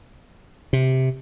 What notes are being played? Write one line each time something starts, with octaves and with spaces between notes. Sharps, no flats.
C3